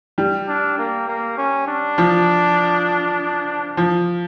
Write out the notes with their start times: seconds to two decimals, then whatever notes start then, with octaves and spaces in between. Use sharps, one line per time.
0.18 G3
0.48 D4
0.78 A#3
1.08 A#3
1.37 C#4
1.67 D4
1.98 F3
3.77 F3